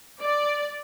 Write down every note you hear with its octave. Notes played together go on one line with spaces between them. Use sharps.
D5